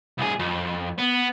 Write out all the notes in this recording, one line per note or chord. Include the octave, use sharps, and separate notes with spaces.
C2 G#4
F2
B3